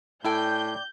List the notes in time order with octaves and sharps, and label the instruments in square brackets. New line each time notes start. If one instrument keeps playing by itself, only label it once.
[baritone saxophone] A2 [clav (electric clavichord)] E4 A4 [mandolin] D5 G5 G#5 [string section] G6